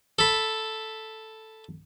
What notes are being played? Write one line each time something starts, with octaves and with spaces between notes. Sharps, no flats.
A4 B5